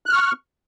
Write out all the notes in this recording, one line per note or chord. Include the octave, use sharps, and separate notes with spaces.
C#6 F6 F#6